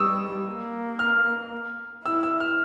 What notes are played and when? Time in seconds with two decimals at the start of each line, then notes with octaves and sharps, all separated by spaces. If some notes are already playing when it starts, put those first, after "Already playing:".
Already playing: G3 C#6 D#6 E6
0.47 A#3
0.99 F6
2.05 E4 E6
2.23 E6
2.40 F6